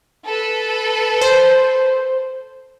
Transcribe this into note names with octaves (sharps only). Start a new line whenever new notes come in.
A4 B4
C5